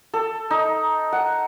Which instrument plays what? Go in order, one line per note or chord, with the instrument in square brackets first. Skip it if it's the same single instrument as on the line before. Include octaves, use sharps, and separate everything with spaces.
[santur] A4
D#4
F#5